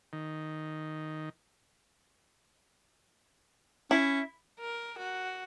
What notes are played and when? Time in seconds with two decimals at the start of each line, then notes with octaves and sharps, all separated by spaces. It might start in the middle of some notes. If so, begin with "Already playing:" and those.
0.13 D#3
3.91 C#4 E4
4.60 A#4
4.98 F#4